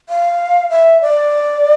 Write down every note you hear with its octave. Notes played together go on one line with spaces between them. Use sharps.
F5
E5
D5